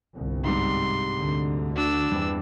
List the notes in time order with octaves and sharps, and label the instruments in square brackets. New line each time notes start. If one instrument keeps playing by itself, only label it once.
[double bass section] G1 C2
[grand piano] G#2 C3 G3 [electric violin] C6
[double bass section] D2 D3
[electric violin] D4 E6 [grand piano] F#4
[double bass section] E2 E3 C4 [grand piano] G2